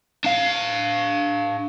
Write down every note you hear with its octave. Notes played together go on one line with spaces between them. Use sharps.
D4 F5